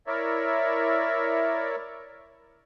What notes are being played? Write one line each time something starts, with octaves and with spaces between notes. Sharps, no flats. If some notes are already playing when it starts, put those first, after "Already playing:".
E4 A#4 C#5 D5 E5